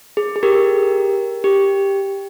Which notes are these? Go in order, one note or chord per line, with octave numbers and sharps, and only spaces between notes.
G#4
G#4
G4 A#4
G4